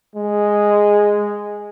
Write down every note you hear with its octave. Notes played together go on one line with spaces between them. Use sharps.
G#3